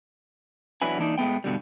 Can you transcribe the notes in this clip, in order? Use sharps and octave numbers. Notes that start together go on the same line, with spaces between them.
E2 F#3 D4 E4 B4 G#5
D3 E3 A#3 D4 D#4
A2 G#3 A3 B3 G5
G2 B2 D3 G3